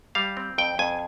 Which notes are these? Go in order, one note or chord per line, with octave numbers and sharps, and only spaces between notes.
G3 F5
C4
F2 G5
F2 G#5